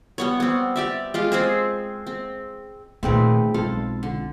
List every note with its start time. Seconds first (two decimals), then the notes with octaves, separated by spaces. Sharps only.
0.18 G3 B3 C#5
0.40 B3 C4
0.76 G4 D5 E5
1.14 G#3 F4 G4
1.32 C4 G#4 C5
2.07 C4
3.03 A#2 D#3 A3 C4 D#4 G#4 B4 G5
3.54 B1 G#3 C4 F4 A4 F5
4.03 D3